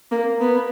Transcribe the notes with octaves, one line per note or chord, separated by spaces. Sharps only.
A#3
B3